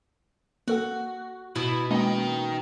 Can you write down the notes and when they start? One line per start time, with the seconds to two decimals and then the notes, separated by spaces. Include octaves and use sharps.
0.68 A#3 F#4 A4 F#5
1.56 B2 E4
1.91 G#3 A#3 C#4 D#4 G5